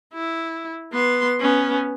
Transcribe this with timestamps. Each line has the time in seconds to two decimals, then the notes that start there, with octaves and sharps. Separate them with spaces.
0.13 E4
0.93 B3 C6
1.40 B3 C#4